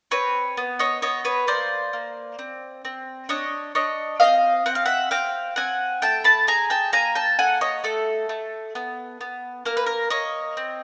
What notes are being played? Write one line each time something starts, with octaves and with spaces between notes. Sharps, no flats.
C4 B4 C#5
B3
C#5 D#5
B3 C#5 D#5
B4 C#5
A#3 C5 D5
A#3
C4
C4
D4 C#5 D#5
D4 C#5 D#5
C4 D#5 F5
C4 F#5
F5
E5 F#5
C4 F5 G5
C4 F#5 G#5
A3 G5 A5
A5 B5
G#4 G#5 A#5
G5 A5
A#3 G#5 A#5
G5 A5
A4 F#5 G#5
C#5 D#5
A3 A4
A3
B3
B3
A#3 A#4
B4
A#4
A#3 C#5 D#5
C4